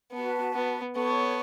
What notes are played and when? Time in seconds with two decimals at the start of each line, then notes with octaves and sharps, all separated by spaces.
0.13 B3 F#4 B4 A5
0.54 B3
0.95 B3 A4 C#5 A5 C#6